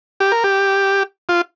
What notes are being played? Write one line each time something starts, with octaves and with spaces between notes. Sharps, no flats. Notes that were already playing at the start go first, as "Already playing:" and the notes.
G4
A#4
G4
F4